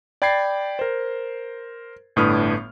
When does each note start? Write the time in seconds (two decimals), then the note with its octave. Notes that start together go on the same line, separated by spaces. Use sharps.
0.22 D5 G5 B5 G#6 A6 C7
0.79 A#4 C5
2.16 G1 A2 D4 B4 D#6 F6